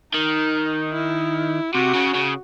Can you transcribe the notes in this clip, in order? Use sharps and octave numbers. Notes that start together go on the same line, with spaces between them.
D#3 D#4
E4
C3 F#4
C#3
C#3